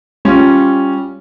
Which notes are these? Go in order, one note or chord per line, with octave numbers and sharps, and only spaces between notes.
G3 C#4 F4